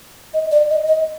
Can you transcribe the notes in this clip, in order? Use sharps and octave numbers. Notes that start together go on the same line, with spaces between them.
D#5
D5
D#5
D#5